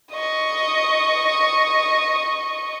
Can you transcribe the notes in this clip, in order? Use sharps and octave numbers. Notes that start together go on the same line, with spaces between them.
D#5 C#6